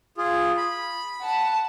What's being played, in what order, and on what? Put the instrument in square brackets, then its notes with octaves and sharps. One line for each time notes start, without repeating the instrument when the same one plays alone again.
[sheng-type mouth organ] F4 G#4
B5
[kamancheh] F#5 A5